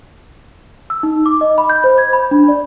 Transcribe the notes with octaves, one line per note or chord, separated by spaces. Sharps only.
E6
D#4
D6
D#5
B5
G6
C5
G#6
B5
D4
D5